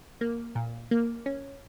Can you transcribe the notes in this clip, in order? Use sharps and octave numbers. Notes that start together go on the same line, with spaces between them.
A#3
A#2
A#3
C#4